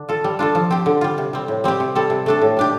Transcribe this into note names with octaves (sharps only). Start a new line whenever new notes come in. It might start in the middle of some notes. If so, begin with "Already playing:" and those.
Already playing: D3 D4
F4 A4
G3
D4 F4 A4
F3
C4 G4
D3
G3 F4
C3
G3 C4
A2
G3 C4 G4
C3
G3 C4 A4
C3
A3 D4 A4
A2
G3 D4 G4